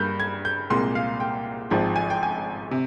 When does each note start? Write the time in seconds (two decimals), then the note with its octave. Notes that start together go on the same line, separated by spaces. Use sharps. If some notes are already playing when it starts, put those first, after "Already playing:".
Already playing: G2 G3 A#3 G6
0.20 G#6
0.45 G6
0.70 C2 A#2 G#3 C6
0.95 F5
1.20 G5
1.70 G#1 G#2 F3 G5
1.96 G#5
2.10 G5
2.23 G#5
2.71 C3